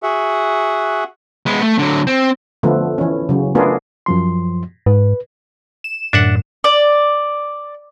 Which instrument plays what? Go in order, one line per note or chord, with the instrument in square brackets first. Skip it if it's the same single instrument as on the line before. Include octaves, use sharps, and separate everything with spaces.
[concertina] F#4 G#4 E5 F#5
[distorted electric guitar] G#3 B3
A3
D3 F#3
C4
[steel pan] D3 F3 A3 B3
E3 C#4
C#3 F#3
A3 B3 D4 F4 G#4 A#4
[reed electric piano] F#2 F3 C6
[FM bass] G#2 [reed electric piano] B4
[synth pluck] E7
[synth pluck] F#2 A2 D3 [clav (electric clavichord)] D4 E5 F#5
[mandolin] D5